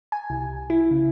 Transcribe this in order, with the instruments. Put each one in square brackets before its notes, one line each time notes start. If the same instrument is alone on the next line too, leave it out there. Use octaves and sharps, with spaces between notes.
[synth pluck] G#5
C2
E4
C#3